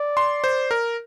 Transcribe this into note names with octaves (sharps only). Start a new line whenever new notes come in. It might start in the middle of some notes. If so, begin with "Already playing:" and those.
Already playing: D5
C6
C5
A#4